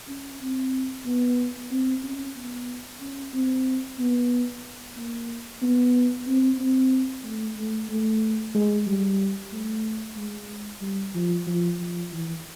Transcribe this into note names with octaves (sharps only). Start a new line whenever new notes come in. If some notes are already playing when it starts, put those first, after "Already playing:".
C#4
C4
B3
C4
C#4
B3
C#4
C4
B3
A#3
B3
C4
C4
A3
A3
A3
G#3
G3
A3
G#3
G3
F3
F3
F3
E3